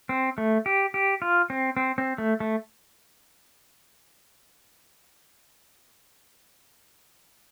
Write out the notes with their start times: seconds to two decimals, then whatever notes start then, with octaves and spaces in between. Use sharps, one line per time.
0.09 C4
0.38 A3
0.66 G4
0.94 G4
1.22 F4
1.50 C4
1.77 C4
1.98 C4
2.18 A3
2.40 A3